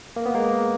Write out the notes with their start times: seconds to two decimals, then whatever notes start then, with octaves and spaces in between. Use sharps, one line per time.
0.16 A#3
0.26 B3
0.35 G#3 A#3